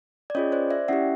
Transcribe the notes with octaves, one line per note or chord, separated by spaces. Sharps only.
D5
C#4 F4 G#4 C#5 D#5
C5 D5
D5 E5
C#4 E4 G4 E5 F#5